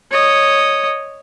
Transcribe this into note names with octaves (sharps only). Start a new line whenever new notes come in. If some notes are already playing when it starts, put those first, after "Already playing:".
C#5 D#5